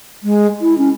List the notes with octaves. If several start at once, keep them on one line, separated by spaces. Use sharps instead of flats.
G#3
E4
C#4